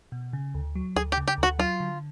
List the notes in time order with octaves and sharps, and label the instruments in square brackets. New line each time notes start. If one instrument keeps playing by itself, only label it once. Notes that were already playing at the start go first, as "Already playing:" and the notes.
[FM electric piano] B2
C#3
D2
F#3
[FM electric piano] D2 [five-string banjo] G#4
[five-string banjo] G4
[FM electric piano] C#3
[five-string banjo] G4
[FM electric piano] D2
[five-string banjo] F#4
[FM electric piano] F#3 [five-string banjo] F4
[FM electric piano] D3